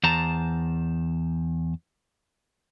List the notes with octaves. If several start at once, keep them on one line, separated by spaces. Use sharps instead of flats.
E2 C5 A5 A#5